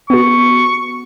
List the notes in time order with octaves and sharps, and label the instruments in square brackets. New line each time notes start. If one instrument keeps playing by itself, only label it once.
[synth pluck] B3 F#4 [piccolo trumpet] C#6